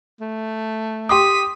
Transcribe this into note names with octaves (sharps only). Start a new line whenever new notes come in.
A3
G4 C6 D6 D#6 B6 D#7